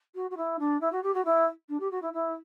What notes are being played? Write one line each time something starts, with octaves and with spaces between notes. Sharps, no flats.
F#4
F#4
E4
D4
E4
F#4
G4
F#4
E4
D4
G4
F#4
E4
E4